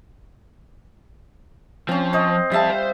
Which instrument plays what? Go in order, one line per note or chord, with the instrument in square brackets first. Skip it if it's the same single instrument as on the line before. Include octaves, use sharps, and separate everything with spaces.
[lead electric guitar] F3 [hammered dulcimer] C4 C#4
[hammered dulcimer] C5 D#5
[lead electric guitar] F2 A5 [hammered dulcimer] G3 E5 F5
[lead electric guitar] C5